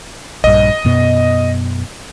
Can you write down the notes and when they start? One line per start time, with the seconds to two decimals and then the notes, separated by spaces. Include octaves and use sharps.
0.44 A#1 G2 D#5
0.85 F#2 B2 B3